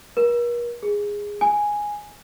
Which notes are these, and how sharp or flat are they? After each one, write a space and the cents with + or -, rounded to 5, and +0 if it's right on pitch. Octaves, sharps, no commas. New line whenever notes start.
A#4 +45
G#4 -10
G#5 -5